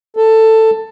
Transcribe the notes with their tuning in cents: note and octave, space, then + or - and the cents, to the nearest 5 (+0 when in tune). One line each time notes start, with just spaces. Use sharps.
A4 +10